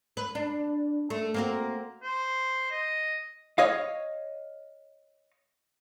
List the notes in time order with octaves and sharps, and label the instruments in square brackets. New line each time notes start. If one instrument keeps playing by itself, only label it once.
[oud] B4
D4
A3
A#3 C4 F#4
[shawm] C5
D#5
[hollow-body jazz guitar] C#5 D#5 F5